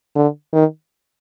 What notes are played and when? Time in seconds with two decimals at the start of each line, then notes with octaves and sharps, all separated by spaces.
0.15 D3
0.53 D#3